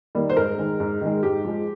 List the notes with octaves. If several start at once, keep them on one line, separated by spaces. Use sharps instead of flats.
D#3 G3 A#3
C5
G#2 A#4
D#3 G#3
G#2
D#3 G#3
G#2 G4
F3 G#3